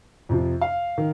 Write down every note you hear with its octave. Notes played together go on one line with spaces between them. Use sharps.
F2 C3 F3
F5
D#3